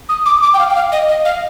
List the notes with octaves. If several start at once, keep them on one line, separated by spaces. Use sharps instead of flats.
D#6
D6
D6
G5
F5
G5
F5
D#5
D#5
F5